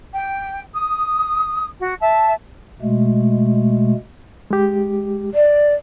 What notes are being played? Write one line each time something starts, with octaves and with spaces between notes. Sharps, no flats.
G5
D#6
F#4
E5 A5
B2 G#3 A3
G#3 G4
D5